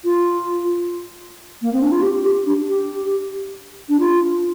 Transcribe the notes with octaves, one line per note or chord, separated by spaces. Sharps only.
F4
A#3
C4
D4
F4
G4
G4
D4
G4
D4
F4